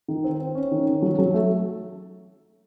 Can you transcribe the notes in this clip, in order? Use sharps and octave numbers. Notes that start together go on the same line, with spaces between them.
D#3
C4
C4
C#4
D#3
C#4
F#3
F#3
A3